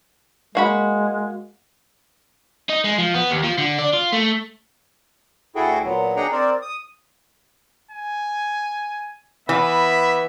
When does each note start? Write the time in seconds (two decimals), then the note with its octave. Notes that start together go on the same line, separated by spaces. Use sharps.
0.55 G#3 A#3 F#4 B5
2.69 D#4
2.84 G#3
2.98 F3
3.14 B3
3.31 D#2
3.44 F3
3.58 D3
3.79 D4
3.93 F4
4.12 A3
5.56 D2 E4 F#4 G#4 A4 G5
5.85 A#2 F#3 B3
6.16 D4 D#4 G#4 F#5 G5 A#5
6.32 C4 A#4 C5 D5
6.62 D#6
7.91 G#5
9.49 E3 B3 E5 B5